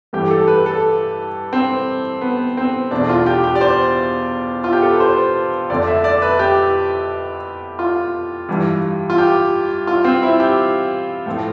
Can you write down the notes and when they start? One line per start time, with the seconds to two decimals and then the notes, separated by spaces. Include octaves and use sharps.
0.13 G2 E3 A3 G4
0.31 A4
0.48 B4
0.66 A4
1.53 C4
2.21 B3
2.57 C4
2.91 E2 B2 A3 D4
3.09 F4
3.26 G4
3.44 G4
3.55 D5
3.61 C5
4.64 F4
4.73 G4
4.82 A4
4.91 B4
5.00 C5
5.70 F2 D3 A3 D5
5.87 E5
6.04 D5
6.22 B4
6.39 G4
7.79 F4
8.49 G2 E3 G3
9.10 F4
9.18 G4
9.87 F4
10.04 C4
10.23 E4
10.40 G4
11.26 A2 F3 A3